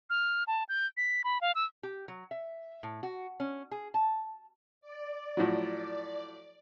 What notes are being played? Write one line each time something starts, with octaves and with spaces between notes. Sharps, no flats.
F6
A5
G6
B6
B5
F5
E6
G4
F#3
E5
A2
F#4
C#4
G#4
A5
D5
A2 F3 F#3